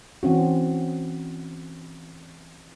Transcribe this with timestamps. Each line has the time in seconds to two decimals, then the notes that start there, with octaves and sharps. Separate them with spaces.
0.23 E3 C4 C#4 F#4